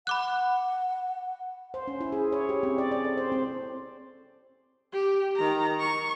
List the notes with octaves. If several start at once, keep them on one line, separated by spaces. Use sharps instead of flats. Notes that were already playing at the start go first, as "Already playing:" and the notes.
F#5 B5 D6 F#6
C5
C#4
E4
G#4
C#5
G4
C4
D5
D5
A4
C5
C4
G4
D#3 A#5
C#6